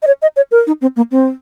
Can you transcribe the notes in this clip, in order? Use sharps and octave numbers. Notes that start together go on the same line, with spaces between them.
D#5
C#5
D#5
C#5
A#4
D#4
C4
A#3
C4